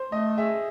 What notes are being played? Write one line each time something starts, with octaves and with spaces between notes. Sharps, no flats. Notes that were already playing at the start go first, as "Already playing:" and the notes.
Already playing: C5
A3 D#5
G#4 E5